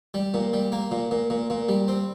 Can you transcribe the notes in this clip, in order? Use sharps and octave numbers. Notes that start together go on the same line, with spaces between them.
G3
A#2
G3
A#3
A#2
A#2
A#2
A#2
G3
C4